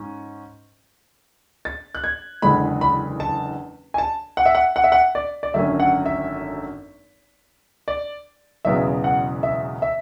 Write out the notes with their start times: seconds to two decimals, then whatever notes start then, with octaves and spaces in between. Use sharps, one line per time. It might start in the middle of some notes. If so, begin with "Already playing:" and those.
Already playing: G#2 C#4
1.65 A6
1.95 F#6
2.04 G#6
2.42 F#1 E2 D3 G#3 B5
2.81 B5
3.20 A5
3.94 G#5
3.98 A5
4.37 F#5
4.46 E5
4.55 F#5
4.76 F#5
4.84 E5
4.92 F#5
5.15 D5
5.43 D5
5.54 G#1 F#2 D3 A3 C#4 E5
5.80 F#5
6.06 E5
7.88 D5
8.65 E1 E2 C#3 F#3 B3 E5
9.04 F#5
9.43 E5
9.82 E5